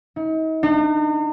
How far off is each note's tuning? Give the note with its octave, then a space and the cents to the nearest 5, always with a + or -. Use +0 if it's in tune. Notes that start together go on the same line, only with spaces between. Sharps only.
D#4 +40
D#4 -45